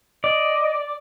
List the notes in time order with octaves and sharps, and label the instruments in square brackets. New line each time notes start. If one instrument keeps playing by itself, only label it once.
[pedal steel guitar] D5 [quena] D#5